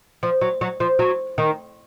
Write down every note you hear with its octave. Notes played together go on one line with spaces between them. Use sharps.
F3
F#3
F#3
F3
F#3
D#3